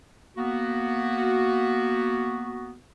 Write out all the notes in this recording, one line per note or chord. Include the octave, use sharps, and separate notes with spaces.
A#3 B3 F#4